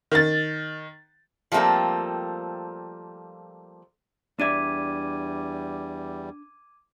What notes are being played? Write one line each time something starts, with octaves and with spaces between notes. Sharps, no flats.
D#3 A6
F3 G3 A3 A#3 C4 A4
E2 G3 D4 D5 E5 D6 G#6 D#7